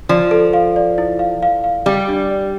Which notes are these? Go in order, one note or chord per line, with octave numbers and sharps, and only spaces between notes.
F3 D5
A4
F5
D5
E4
F5
F5
F5
G3 D5
D4
D5